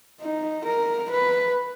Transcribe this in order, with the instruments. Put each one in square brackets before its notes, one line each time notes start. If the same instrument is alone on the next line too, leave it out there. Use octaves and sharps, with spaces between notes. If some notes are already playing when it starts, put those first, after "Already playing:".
[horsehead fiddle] D#4
A#4
B4